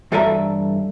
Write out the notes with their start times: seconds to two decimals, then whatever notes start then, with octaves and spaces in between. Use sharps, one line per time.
0.12 G2 E3 A4 D5 E5 A#5